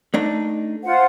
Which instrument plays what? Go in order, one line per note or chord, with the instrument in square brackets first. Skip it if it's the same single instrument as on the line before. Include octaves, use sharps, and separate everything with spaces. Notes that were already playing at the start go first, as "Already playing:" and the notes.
[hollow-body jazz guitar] A3 D4 D#4
[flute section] F4 C5 F#5